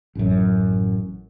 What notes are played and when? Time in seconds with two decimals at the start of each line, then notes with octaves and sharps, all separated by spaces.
0.15 A1 F#2